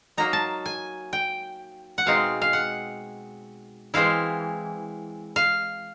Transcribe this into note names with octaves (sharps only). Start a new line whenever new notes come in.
F#3 A#3 D#4 A#5
A5
G#5
G5
F#5
B2 G#3 C4 D#4 F5
F5
F#5
E3 G#3 C4 E4 F5
F5